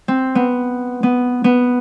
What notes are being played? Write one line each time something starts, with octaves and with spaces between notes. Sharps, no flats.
C4
B3
B3
B3